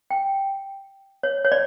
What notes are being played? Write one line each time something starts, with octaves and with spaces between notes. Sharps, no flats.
G5
C#5
C#5
D5